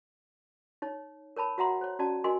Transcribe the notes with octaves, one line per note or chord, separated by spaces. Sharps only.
D#4 C#5
A#4 C#5 A5 B5
F#4 C#5 E5 F#5 A#5 C6
C5 C#5
C#4 F#4 D5 A5
F#4 A#4 D#5 G#5 C6